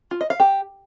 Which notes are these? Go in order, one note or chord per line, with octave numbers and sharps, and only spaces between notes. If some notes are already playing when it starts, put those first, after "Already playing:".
F4
D#5
F5
G4